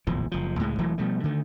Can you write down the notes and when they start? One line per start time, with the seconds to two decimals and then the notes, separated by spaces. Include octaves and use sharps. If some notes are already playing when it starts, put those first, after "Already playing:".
0.07 D1 A#1 E2 F3
0.32 F#1 F3
0.59 C#2 A2 G#3
0.78 E1 E3 F#3 A3
0.98 B2 F3 G3 A3
1.24 D3 D#3 A3